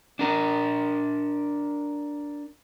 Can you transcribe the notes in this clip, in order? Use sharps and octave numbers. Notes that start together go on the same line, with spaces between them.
D4 A#4